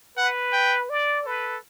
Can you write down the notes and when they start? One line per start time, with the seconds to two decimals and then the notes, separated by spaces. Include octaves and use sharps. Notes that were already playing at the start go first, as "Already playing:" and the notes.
0.17 B4 F#5
0.53 G5
0.90 D5
1.25 A4 B4